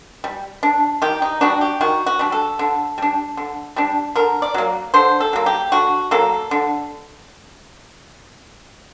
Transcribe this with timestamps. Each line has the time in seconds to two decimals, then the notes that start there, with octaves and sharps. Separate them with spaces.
0.24 G3
0.63 D4
1.02 D#3 G4
1.22 D#4
1.41 G3 D4 F#4
1.61 G4
1.81 D#3 F#4
2.06 F#4
2.19 G3 D4
2.32 A4
2.59 D3
2.98 G3 D4
3.37 D3
3.76 G3 D4
4.15 D3 A#4
4.42 D5
4.54 F#3 A#3
4.94 D3 C5
5.20 A4
5.33 F#3 A#3
5.46 G4
5.72 D3 F#4
6.11 F#3 A#3 A4
6.51 D3